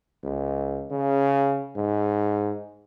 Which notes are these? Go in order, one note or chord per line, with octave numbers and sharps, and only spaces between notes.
C#2
C#3
G#2